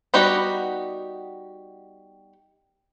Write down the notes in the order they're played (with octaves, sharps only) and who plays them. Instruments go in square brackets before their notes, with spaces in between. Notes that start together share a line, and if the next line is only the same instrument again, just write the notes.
[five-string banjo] G3 B3 D#4 F#4 G4